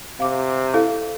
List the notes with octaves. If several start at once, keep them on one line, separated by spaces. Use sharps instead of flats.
C3 F5 D6
E4 A4 F5